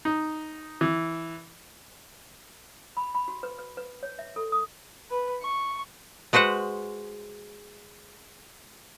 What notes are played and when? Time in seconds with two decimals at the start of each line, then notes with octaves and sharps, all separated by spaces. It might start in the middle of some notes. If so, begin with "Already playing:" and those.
0.05 D#4
0.81 E3
2.97 B5
3.15 B5
3.28 F#4
3.43 B4
3.58 B4
3.77 B4
4.03 C#5
4.19 E5
4.36 A4
4.52 D#6
5.10 B4
5.42 C#6
6.33 G#3 F#4 B4 C5 F#5